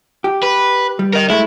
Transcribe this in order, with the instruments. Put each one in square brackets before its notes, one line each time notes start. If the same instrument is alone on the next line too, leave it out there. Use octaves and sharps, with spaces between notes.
[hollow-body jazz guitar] G4
[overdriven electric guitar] B4
[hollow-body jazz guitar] G3
[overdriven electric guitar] A#4 D#5
[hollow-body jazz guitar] G#3 A3 [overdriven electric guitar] E4